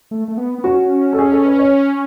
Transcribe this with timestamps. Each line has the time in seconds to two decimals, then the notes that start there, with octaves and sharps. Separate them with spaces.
0.11 A3
0.28 A3
0.38 B3
0.58 B3
0.64 C#4 F#4
1.13 A4
1.19 G#4
1.32 A4
1.45 B4
1.59 C#5